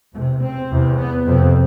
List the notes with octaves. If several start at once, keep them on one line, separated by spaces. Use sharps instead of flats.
E2 C3 A3
C4
E2 C3
B3
F2 C3 C4